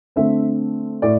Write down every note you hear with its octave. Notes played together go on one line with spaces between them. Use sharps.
D3 A3 C4 E5
A2 D5